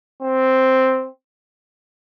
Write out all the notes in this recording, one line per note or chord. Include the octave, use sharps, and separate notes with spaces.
C4